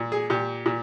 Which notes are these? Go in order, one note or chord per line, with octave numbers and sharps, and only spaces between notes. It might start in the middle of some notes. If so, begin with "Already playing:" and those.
Already playing: A#2
G#4
A#2 G4
A#2